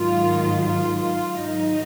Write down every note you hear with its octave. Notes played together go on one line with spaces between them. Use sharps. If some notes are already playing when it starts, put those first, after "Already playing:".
Already playing: G#2 D#3 F#3 F4
F4
F4
G#2 D#3 F#3 D#4